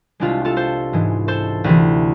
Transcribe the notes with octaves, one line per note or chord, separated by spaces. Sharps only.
C2 C3 G#3 D4 F4
F4 A4
A4 C5
G#2 E3 G#3
A4 C5
D2 C3 E3